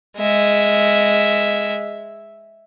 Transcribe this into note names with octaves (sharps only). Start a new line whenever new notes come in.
G#3 E5